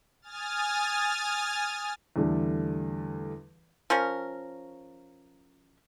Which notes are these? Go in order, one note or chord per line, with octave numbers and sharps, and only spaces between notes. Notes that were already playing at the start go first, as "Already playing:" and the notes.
G#5 D#6 F6 A6
E2 D3 G3 A3
F3 C#4 A#4